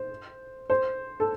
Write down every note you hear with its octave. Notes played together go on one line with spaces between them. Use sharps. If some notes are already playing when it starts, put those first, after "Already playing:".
Already playing: C5
C5
A4